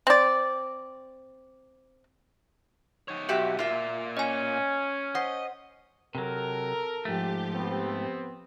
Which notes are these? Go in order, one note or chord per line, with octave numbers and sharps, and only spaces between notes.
C4 D5
D#4 C#5
B1 F#4 G4 E5
A#2 A#3 F4 E5
C#4 D#5 G#5
C5 D#5 F#5
C3 F#3 A4 A#4
G#2 F3 A3 G4
B3 C4